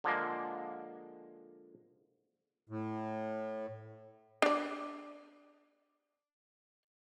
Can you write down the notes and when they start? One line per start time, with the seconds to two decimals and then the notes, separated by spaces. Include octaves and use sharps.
0.04 D3 F3 G#3 A#3
2.69 A2
4.42 D4 D5